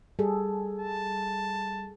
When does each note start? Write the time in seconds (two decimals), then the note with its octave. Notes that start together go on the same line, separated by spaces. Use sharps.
0.19 G3 G#4 A4
0.79 A5